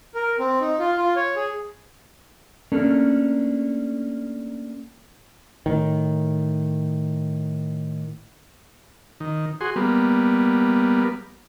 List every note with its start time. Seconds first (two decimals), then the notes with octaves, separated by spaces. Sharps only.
0.15 A#4
0.39 C4
0.61 D#4
0.79 F4
0.97 F4
1.16 C#5
1.36 G#4
2.72 A3 A#3 C#4 D4 A4 A#4
5.66 A2 D#3
9.20 D#3
9.61 F#4 G#4 C6
9.76 G3 A#3 B3